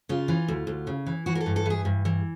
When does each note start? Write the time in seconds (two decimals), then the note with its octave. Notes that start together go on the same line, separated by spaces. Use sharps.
0.09 C#3 F4
0.28 E3
0.48 D2
0.67 D2
0.87 C#3
1.06 E3
1.26 E3 F#4
1.35 A#4
1.40 A4
1.46 G2
1.56 A4
1.66 E3 G#4
1.85 G2
2.05 E3